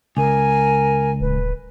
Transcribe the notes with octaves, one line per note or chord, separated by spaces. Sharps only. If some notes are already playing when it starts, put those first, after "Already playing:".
C#2 A#4 G#5
D1 B4